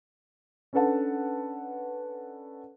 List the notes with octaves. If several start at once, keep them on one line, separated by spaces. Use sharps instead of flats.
C#4 D4 A4 B4 F#5 A5